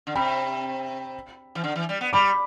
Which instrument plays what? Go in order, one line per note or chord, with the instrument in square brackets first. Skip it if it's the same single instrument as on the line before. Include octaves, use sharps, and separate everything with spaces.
[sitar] D3
[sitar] C3 [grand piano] G5 B5
[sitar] E3
D3
E3
G3
B3
[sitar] G3 [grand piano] B5 D6